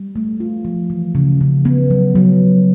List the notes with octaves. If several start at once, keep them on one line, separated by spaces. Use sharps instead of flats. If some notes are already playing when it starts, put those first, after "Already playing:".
Already playing: G3
A3
F4
F3
E3
C#3
C#3
B3
F#3
F#3